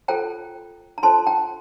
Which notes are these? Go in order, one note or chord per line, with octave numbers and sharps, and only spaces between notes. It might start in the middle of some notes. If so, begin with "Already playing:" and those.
F4 A4 C5 G5 A#5
A#5
F4 A4 C5 A5 C6
G5 A#5